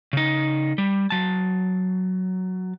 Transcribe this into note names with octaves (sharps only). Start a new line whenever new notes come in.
C#3 D#4
G3
F#3 A5